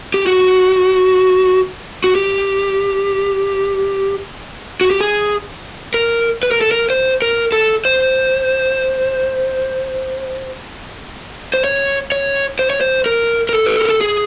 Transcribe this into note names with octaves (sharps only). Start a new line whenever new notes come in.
G4
F#4
F#4
G4
F#4
G4
G#4
A#4
B4
A#4
A4
A#4
C5
A#4
A4
C5
C5
C#5
C#5
C5
C#5
C5
A#4
A#4
A4
B4
A#4
A4
G#4